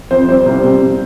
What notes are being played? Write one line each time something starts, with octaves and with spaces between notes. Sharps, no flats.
F2 C5
G3 C5
C2
C2